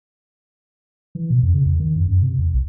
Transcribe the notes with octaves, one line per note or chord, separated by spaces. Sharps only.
E3
B2
F2
C#3
E2
D#3
F#2
F#2
C3
E2
B1